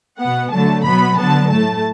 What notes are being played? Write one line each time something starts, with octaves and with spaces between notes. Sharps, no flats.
B2 B3 F#5
D3 F#3 A3 A5
B2 F#3 B3 B5
D3 F#3 B3 A5
A2 A3 A5